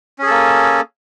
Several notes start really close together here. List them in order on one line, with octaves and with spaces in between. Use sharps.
C#4 G#4 A4 A#3